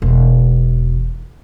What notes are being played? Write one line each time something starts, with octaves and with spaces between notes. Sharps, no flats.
E1